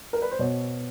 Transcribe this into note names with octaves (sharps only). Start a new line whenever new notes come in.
A#4
B4
C5
B2 C#5